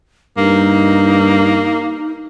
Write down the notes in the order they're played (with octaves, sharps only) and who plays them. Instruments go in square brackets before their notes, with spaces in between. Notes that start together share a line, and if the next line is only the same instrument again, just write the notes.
[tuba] G2 [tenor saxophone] A#3 [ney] D#4